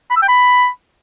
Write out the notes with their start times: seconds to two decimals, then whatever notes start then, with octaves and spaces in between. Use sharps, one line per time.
0.10 B5
0.16 E6
0.22 G5
0.28 B5